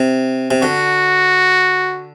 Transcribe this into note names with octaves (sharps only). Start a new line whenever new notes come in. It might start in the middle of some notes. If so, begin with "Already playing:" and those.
Already playing: C3
C3
D3 F#4